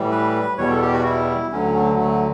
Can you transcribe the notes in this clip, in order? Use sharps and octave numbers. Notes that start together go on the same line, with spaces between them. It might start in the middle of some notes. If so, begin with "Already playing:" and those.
Already playing: A2 E3 G3
B4
E2 B2 G3 C#5
A4
G4
F#4
E4
D2 D3 F#3 C#4
A3
A3